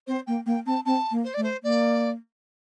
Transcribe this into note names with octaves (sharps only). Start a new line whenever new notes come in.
C4 C5
A#3 G5
A#3 G5
C4 A5
C4 A5
A#3
C5
A3 D5
C5
A#3 D5